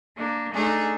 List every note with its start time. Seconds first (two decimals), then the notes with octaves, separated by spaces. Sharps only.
0.15 A#3 D4
0.52 A3 D4 D#4 G#4